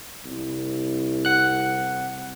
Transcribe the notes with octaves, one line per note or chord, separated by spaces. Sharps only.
C2
F#5 F#6